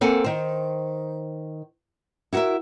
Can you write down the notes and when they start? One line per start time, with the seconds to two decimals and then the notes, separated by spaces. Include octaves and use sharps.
0.01 A#3 C4 A4 A#4 F#5 G#5
0.24 D#3 C5
2.33 E4 F#4 G#4 A#4 E5